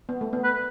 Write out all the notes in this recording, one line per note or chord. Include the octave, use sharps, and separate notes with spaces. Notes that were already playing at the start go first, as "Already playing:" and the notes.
B3
A3
B3
B4